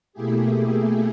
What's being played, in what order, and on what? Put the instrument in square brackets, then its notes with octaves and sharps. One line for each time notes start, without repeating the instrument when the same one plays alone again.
[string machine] B2 A3 A#3 E4 G4 G#4